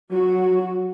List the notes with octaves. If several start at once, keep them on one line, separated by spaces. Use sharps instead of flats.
F#3 F#4